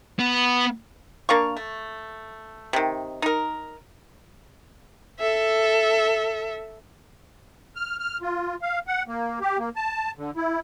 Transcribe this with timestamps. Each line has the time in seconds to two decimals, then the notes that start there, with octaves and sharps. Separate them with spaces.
0.19 B3
1.29 A#3 D4 F5 C#6
1.57 A3
2.73 C3 D#3
3.22 D#4 A#4
5.20 A4 E5
7.76 F6
7.99 F6
8.22 F4
8.62 F5
8.87 F#5
9.08 A#3
9.41 G4
9.59 A#3
9.76 A5
10.17 D3
10.37 E4